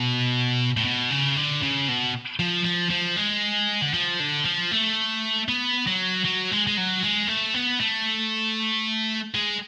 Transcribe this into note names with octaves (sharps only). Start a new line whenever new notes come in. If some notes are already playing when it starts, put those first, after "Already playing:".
Already playing: B2
A2
B2
C#3
D3
C#3
B2
F3
F3
F3
G#3
D3
F3
D3
F3
A3
B3
F#3
F#3
G#3
G#3
F#3
G#3
A3
B3
A3
G#3